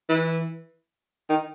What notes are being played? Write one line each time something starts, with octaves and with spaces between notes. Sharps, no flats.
E3
D#3